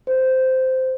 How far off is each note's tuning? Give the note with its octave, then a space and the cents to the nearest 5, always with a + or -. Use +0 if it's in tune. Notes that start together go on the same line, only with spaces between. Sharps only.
C5 -10